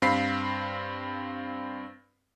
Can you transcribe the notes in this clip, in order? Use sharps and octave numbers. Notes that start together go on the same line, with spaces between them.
G2 C4 F5 B5 B6 C7